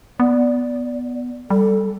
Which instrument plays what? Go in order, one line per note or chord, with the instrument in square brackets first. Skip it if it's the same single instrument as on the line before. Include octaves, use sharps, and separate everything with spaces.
[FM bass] B3 [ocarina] D5
[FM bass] G3 [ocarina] A4